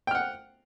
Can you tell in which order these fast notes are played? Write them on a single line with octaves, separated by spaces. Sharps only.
G5 F6 F#5